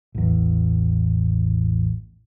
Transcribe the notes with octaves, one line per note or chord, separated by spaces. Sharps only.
A1 E2